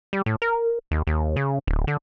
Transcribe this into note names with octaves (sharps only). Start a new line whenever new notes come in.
G3
A2
A#4
D#2
D#2
C#3
D1
D3